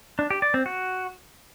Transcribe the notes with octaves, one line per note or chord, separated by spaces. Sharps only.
D4
G4
D5
C4
F#4